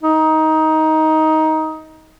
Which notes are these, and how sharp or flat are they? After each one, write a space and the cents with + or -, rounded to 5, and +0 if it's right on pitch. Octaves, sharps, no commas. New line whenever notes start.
D#4 +15